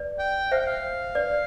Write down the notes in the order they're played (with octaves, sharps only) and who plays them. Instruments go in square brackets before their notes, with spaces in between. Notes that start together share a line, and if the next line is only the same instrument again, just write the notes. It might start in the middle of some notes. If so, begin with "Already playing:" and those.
Already playing: [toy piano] B4 D5
[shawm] G5
[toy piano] C5 E5 [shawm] F5
[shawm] G5
F5
[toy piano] B4 D5